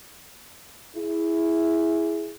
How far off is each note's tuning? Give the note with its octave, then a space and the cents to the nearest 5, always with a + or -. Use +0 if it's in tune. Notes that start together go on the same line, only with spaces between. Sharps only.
E4 +0 G#4 +0